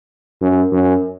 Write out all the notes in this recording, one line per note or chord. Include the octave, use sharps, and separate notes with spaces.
F#2
F#2